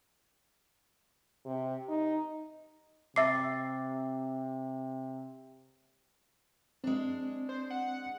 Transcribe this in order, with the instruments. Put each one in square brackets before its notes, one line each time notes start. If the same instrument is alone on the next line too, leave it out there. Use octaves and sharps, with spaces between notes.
[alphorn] C3
D#4
[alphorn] C3 [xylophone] E5 C7 [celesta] D6 E6 A6
[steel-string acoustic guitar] G#3 D4 [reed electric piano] C4
[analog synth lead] C5
F#5